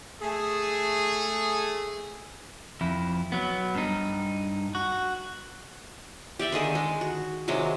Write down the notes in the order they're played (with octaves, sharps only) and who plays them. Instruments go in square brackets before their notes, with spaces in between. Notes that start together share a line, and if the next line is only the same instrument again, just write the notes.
[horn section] A3 G#4
[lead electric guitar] F2 E4
F#3 B3
G2 D#4
F#4
[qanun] G4 D5 E5 G5
D3 D#3 G#4 A4
G#3
F#4
C3 D#3 F#3 G#3